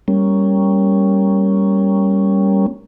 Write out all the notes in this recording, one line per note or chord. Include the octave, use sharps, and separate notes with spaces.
G3 A#3 C#4